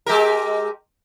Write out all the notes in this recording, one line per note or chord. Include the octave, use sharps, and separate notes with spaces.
G#3 G4 A#4